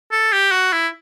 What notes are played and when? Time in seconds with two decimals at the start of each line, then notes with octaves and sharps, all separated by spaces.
0.12 A4
0.32 G4
0.51 F#4
0.72 E4